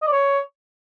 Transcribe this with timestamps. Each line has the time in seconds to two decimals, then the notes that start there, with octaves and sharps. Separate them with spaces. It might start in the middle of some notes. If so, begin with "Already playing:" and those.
0.02 D#5
0.07 D5
0.12 C#5